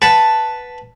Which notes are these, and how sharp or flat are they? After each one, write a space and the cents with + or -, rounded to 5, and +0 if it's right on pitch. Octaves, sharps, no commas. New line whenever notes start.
B4 +0 F#5 +0 A5 +0